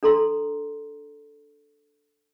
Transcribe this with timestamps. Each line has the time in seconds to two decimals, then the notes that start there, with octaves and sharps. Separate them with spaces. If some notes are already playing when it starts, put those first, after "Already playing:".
0.03 D4 A4 A#5 C6